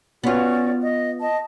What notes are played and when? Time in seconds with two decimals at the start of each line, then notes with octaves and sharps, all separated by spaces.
0.24 B3 C#4 F4 F#4 D5
0.82 D#5
1.20 D#5 A5